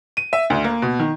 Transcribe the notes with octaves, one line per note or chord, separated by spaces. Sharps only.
D#7
E5
D2
A#3
B2
D#3